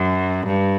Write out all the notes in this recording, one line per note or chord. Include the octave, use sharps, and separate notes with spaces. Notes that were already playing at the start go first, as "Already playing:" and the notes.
Already playing: F#2
G2